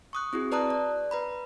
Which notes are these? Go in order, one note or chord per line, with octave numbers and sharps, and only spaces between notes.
C#6 D#6 F#6
C4 E4 F#4 G#4
B4 D5 A5 A#5 D#6 F#6
D5
B4 A#5 B5